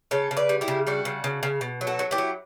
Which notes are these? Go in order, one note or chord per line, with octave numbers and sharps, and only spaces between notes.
C#3 A4 C#5
C#3
B4 D5
G3
E4 G4
C#3
G3 D4 F#4
C#3
C#3
C#3
B2
F#3
F#4 A4
F#3
E4 G4
F#3